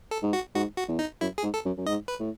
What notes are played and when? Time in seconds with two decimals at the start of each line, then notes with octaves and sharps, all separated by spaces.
0.11 A4
0.22 G#2
0.33 F#4
0.55 G#2 F#4
0.77 F#4
0.88 E2
0.99 D#4
1.21 F#2 E4
1.38 G#4
1.43 G#2
1.54 A4
1.65 F#2
1.77 F#2
1.86 G#2 D#5
2.08 B4
2.20 A2